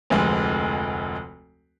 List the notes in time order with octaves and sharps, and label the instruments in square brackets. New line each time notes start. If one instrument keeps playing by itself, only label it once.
[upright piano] F1 D2 G#3